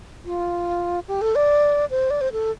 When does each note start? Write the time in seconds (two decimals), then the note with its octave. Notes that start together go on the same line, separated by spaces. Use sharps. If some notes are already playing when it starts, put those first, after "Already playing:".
0.25 F4
1.08 G4
1.21 A4
1.35 D5
1.91 C5
2.10 D5
2.21 C5
2.32 A4